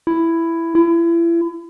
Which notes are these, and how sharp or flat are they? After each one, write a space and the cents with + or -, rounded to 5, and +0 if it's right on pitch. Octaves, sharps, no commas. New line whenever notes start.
E4 +10
E4 +35